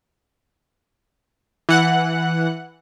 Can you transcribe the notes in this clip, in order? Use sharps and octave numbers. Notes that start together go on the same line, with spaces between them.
E3 F#5 F#6